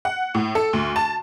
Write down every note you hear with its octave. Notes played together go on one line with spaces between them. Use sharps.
F#5
A2
A4
D2
A5